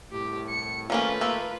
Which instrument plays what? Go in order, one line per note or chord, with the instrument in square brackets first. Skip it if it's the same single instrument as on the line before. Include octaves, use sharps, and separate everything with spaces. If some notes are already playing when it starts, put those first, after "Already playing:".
[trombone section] C2 A2 [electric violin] G4
[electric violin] C#7
[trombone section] D#3 A3 [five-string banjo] F3 A#3 C#4 [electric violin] F4 B4
[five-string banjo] A#3 A4